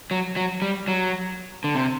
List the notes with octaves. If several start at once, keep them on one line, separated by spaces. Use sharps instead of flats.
F#3
F#3
G3
F#3
D3
C3